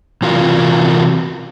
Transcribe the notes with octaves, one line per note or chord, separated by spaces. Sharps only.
C3 E3 F4 F#4 A#4 F5